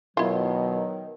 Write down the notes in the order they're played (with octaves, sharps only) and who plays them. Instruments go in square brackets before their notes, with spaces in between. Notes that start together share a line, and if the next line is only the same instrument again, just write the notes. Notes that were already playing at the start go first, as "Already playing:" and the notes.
[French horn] B2 [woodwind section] D#3 F#3 [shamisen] E4 F4